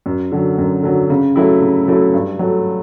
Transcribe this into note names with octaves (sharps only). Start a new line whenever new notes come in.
F#2
D3 F#3
F#2
D3 F#3
C#3
F#3 A3 E4
C#3
F#3 A3 E4
G2
F#3 A3